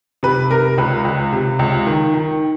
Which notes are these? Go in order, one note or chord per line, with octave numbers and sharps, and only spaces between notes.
C3 B4
C3 A#4
C#2 B4
C#2
C3
C#2
D#3
D#3